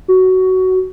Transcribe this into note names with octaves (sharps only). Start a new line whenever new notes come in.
F#4